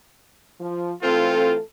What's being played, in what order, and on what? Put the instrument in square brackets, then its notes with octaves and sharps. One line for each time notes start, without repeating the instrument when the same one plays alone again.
[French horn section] F3
[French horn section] E3 A3 A4 [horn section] C4 F4